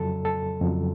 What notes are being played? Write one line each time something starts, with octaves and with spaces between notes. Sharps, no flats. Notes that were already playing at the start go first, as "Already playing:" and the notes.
Already playing: F2 C#3 F#3 A4
A4
F2 C#3 F#3